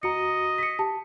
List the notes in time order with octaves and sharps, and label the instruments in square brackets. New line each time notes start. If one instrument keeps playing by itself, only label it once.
[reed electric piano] D2 F#4 A#5 [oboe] D#5 [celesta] C#7
[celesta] B6 C#7
[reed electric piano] G4 [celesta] A5